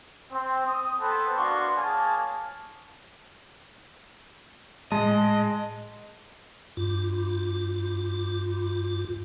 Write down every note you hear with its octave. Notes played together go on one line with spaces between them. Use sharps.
C4
D#6
B3 C4 A4
A#3 B3 D4 F#4 C6 C#6
A#3 G#4 C#5 G#5 A5
A2 G#3 D#5 A5
G2 F4